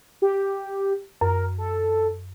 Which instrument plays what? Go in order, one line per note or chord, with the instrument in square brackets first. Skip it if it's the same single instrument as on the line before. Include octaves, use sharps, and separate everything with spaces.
[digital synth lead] G4
[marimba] F#2 [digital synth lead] A#4
[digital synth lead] A4